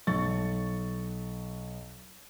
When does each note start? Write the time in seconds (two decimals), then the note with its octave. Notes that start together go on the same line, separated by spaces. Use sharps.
0.07 B1 C#6 A6